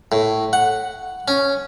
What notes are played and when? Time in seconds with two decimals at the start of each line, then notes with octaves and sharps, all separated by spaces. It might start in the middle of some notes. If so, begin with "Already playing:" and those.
0.12 A2
0.53 F#5
1.28 C#4